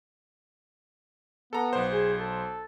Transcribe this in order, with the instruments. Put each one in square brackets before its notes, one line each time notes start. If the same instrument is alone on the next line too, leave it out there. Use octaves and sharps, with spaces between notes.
[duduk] B3 [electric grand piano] A4 A#5
[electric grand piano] B1 C5
[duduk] G#4
A4